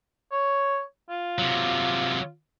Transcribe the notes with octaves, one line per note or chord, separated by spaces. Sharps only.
C#5
F4
C3 F#3